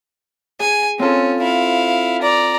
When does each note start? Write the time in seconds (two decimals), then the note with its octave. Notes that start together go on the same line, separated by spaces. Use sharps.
0.60 G#4 G#5
0.99 C4 C#4 F4 A4
1.41 E4 F5
2.22 D5 A#5